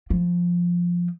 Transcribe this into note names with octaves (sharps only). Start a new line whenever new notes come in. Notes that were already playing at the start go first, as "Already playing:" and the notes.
F3